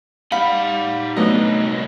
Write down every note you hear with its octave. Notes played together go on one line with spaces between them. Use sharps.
D#4 G4 F5 F#5 B5
C2 F#3 A3 B3 D4 D#5